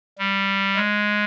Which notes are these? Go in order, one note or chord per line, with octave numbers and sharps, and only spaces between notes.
G3
G#3